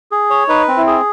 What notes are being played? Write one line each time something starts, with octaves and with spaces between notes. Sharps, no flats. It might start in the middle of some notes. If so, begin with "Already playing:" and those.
G#4
C#5
D#4 B4
C4
E4
G#4